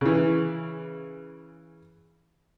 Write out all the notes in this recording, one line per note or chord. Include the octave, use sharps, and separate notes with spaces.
C#3 E3